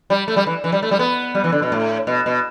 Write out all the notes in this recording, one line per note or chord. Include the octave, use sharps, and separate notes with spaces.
G3
A3
G3
E3
E3
G3
A3
G3
B3
G3
E3
D3
B2
A2
B2
B2